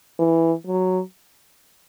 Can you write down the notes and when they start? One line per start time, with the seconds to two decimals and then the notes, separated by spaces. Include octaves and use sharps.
0.19 E3
0.67 F#3